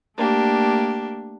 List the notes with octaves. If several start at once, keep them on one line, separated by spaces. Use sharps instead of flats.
A3 A#3 D4 G4